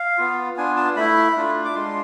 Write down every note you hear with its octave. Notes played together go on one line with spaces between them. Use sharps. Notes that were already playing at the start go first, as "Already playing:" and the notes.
Already playing: F5
B3 F4
B3 D4 F4 G#5
A5
A3 E4 B5
A3 D4 F4
D6
G#3 D4 F4 C6